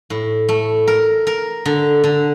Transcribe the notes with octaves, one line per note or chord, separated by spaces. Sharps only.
A2
A3
A#4
A#4
D3
D3